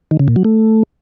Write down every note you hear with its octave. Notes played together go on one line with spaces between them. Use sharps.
D#3
C#3
A#2
F#3
A3